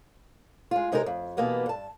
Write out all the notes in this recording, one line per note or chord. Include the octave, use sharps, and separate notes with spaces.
G#3 F4
C3 G#3 D#4 G4 G#4 A#4
F2
B2 E3 A#3 B3 G4
G2 A5